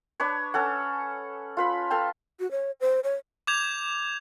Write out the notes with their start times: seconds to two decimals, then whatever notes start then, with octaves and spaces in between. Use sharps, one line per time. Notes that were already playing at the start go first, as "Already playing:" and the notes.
0.20 D4 B4 C#5
0.54 C#4 A4 F#5
1.57 F4 B4 B5
1.90 A4 F5 G5 A5
2.40 F#4
2.51 C#5
2.81 C5
3.04 C#5
3.47 D6 G6 G#6 F7